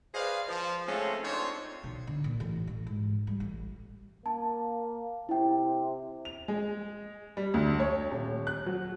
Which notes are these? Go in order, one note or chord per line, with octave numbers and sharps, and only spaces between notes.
G#4 B4 C5 D5 D#5 F5
F3
G#3 A3 C4 C#4 F4 A4
C4 D4 D#4 F4 C5 C#5
B1
D3
A#2
A1
A1
G#2
G3
A1
A#3 A5
C3 E4 G5
F7
G#3
G3
D2
C#5
D#1
F#6
F#3